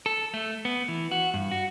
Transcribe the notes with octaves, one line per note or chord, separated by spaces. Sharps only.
A4
A3
B3
E3
F#4
G2
F#4